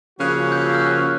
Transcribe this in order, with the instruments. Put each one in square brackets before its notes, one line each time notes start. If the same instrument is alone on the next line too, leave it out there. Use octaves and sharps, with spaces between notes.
[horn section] C#3 F3 A#3 C#4 F#4 [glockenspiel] F#6
[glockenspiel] G6
E6
F6
F#6